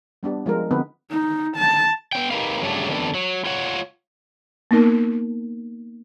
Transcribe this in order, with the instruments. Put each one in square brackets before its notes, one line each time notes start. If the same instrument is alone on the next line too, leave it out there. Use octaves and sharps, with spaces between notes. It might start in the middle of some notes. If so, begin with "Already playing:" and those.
[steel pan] G3 B3 D4 G4
F3 G#3 F4 A#4
D3 F3 B3 C4 D#4 B4
[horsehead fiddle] D#4
A5
[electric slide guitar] B3 C#4 G5
D#4 G4 A#4 B4 F5
G2 C#3 F#3 A3 D4
F2 D#3 B3 D4 A4
F#3
F4 C#5 F#5
[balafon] A#3 B3 D#4 A#4